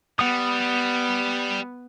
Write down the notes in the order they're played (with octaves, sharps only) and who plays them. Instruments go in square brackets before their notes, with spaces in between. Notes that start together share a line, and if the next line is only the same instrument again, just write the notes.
[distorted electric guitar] G3 [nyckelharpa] B3 [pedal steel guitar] F#5 D#6